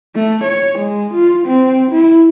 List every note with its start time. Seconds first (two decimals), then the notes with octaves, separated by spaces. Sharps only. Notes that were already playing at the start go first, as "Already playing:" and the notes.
0.16 A3
0.44 C#5
0.78 G#3
1.13 F4
1.46 C4
1.91 E4